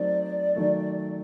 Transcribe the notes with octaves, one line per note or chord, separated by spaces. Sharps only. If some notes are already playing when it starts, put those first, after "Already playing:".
Already playing: F#3 A3 C4 D#4 D5
D#3 F#3 A3